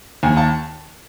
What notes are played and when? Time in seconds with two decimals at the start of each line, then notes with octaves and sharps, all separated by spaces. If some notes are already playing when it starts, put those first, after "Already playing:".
0.23 D#2 G#5
0.37 A5